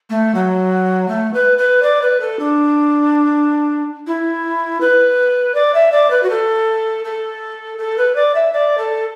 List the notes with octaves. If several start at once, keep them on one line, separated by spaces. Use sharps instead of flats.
A3
F#3
A3
B4
B4
D5
B4
A4
D4
E4
B4
D5
E5
D5
B4
F#4
A4
A4
A4
B4
D5
E5
D5
A4